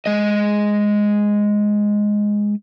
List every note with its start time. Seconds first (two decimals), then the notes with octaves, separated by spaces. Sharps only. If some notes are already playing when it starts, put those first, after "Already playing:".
0.06 G#3 D#5